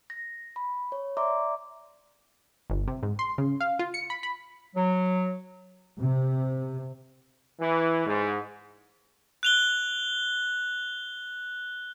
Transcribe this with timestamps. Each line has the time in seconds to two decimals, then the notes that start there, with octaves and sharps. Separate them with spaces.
0.10 A#6
0.56 B5
0.92 C#5
1.17 D5 E5 A#5 C6 D6
2.70 G1
2.88 C3
3.03 G#2
3.19 C6
3.38 C#3
3.61 F5
3.79 F4
3.94 C#7
4.10 B5
4.23 B5
4.75 F#3
5.99 C3
7.60 E3
8.07 G#2
9.43 F#6 F7 G7